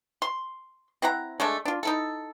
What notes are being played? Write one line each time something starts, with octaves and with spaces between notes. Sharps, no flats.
C6
C4 E4 F#5 A#5
G#3 A3 D4 A4
D4 F4
D#4 E4 A4